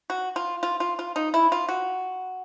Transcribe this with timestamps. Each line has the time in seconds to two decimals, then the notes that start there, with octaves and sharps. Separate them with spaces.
0.10 F#4
0.36 F4
0.63 F4
0.80 F4
0.99 F4
1.16 D#4
1.34 E4
1.52 F4
1.69 F#4